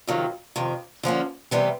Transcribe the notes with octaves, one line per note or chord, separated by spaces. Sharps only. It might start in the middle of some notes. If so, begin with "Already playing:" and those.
F2 C3 D#3 F#3 A#3
F2 C3 D#3
D3 F3 A#3 C#4
C3 E3 G3 B3